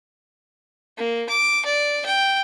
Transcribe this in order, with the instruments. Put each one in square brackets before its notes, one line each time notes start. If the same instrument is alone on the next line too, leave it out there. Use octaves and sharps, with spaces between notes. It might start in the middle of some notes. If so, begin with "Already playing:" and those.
[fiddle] A#3
D6
D5
G5